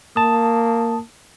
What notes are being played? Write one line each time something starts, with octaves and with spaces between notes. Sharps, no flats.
A#3 A5 D#6